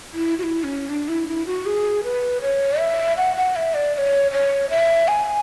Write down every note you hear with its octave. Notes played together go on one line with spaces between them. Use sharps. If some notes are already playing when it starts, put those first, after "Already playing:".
E4
F#4
E4
C#4
D4
E4
E4
F#4
G#4
B4
C#5
E5
F#5
F#5
E5
D5
D5
C#5
C#5
E5
G#5